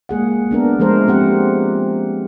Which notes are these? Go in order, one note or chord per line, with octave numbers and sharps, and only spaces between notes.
G#3 A#3 G#4 F#5
B3 D4 A#4
F3 G#3 A3 A#4 C5
A3 C4 G4 F#5